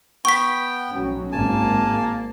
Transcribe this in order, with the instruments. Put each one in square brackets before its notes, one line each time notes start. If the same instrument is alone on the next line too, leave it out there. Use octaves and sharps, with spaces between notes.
[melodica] B3 G5 [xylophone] C#6 B6
[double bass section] B1 F#3 C#4
[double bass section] G#1 [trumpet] A#3 [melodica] G#5 A5